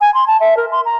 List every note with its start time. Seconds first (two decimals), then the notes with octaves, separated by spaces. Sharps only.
0.01 G#5
0.14 C6
0.27 A5
0.40 E5
0.57 A#4
0.71 C6
0.85 A#5